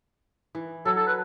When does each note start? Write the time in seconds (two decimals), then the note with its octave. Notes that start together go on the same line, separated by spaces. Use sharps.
0.55 E3
0.85 F#3 A4
0.97 A4
1.07 B4